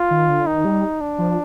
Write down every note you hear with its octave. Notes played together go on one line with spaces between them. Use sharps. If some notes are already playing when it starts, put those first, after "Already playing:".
Already playing: F4
D#3
D3
D#3 D#4
G3
D4
F3